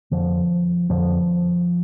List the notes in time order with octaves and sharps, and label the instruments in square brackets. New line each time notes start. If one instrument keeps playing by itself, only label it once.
[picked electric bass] F2 D3 F3
F2 D3 F3